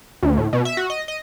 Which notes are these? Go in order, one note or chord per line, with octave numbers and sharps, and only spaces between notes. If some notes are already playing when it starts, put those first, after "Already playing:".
D2
A2
B2
E5
F#4
D#5
D#5